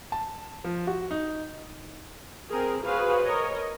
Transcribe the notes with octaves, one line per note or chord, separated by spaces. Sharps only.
A5
F3
F#4
D#4
C4 G#4 A#4
F#4 G#4 B4 C5 F5
A#4 C#5 D#5